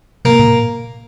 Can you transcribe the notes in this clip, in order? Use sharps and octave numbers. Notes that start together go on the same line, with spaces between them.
C3 A#3
A#2